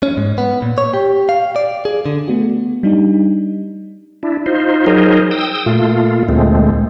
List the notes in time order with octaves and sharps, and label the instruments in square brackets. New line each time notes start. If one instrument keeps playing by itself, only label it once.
[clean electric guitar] C#4
G#2
B3
A#2
C#5
G4
F5
D5
G#4
D3
[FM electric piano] A3 B3 F#4
G3 D4 D#4
[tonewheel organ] D4 E4
D#4 F4 C5
F#3 D#4 G#4 A#4 C5
G5 D#6 E6
A#2 A3 F4
D2 A#2 G#3 A3 C4